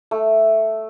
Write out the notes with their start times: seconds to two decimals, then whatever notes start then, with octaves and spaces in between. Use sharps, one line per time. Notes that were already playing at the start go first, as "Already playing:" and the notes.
0.11 A3